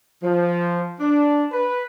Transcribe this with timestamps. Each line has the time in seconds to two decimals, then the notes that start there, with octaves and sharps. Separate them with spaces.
0.23 F3
1.00 D4
1.52 B4